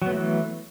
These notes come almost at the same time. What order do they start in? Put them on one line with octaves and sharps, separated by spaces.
F#3 B3 A3 E3